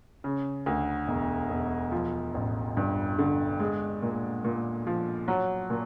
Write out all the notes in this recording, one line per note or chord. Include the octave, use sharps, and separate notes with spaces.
C#3
D2
E1
E1
F3
A1
G2
D3
G#3
A#2
A#2
F3
F#3
A#2